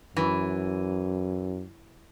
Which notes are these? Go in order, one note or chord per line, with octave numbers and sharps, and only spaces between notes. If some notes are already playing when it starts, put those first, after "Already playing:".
F#2 E3